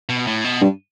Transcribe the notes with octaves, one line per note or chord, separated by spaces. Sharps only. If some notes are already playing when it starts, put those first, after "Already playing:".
B2
A2
B2
G2